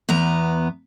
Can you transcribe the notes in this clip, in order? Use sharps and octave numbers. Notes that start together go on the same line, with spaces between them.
E2 B3 A#5